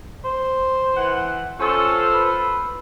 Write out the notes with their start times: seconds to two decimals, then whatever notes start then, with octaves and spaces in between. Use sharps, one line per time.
0.25 C5
0.96 E3 F#5
1.59 C#4 F4 A4 C5
2.13 B4